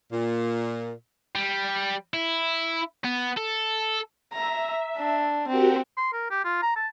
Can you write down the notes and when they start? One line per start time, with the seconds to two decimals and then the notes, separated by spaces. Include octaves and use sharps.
0.11 A#2
1.35 G3
2.14 E4
3.04 B3
3.37 A4
4.33 E5 A#5
4.97 D4
5.48 C4 F#4 G4 A#4
5.97 C6
6.13 A#4
6.31 G4
6.44 F4
6.63 A#5
6.76 A5